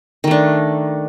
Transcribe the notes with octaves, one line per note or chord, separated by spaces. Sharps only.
D#3 A3 D4